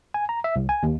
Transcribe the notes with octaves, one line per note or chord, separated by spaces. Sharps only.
G#5
A#5
E5
C2
G#5
D#2